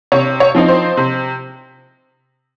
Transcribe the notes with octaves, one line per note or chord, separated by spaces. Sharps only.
C3 C#5
C#5
F3 C4 D#4
C5
C3